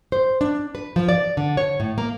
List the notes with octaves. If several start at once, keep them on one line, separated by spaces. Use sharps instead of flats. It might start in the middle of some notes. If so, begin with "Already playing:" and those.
C5
D4
B4
F3
D5
D3
C#5
A2
A#3